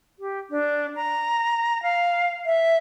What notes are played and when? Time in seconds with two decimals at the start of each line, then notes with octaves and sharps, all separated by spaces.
0.19 G4
0.50 D4
0.96 A#5
1.83 F5
2.46 E5